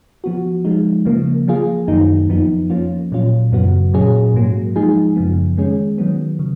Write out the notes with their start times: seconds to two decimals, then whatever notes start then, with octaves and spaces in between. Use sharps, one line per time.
0.24 F3 B3 F#4
0.65 F3 G#3 D#4
1.05 C#3 F3 A#3
1.48 F3 A#3 F4 G#4
1.87 F#2 D#3 F#3 A#3 D#4
2.28 F2 F3 B3 D#4
2.70 F3 A#3 C#4 F4
3.12 A#2 F#3 C#4 F4
3.52 F#2 C#3 F#3 B3 F#4
3.93 A#2 F#3 C#4 G#4
4.34 G#2 F#3 A#3
4.76 F3 G#3 D#4 G#4
5.16 F#2 C#3 F3 B3
5.58 D#3 G#3 C#4 G#4
5.98 D#3 F#3 B3
6.39 C#3